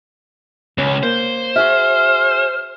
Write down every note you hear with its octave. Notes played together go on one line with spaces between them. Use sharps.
C#2 C#4
A#3 C5
F#4 G#4 E5 F6